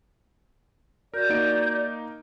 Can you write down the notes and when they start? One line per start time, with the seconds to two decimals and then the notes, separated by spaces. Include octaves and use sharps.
1.14 F#4 A#4 D5 G6
1.29 A#3 D#4 D7